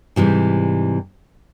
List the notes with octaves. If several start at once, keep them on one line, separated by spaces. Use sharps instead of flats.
G#2 C3 E3 G3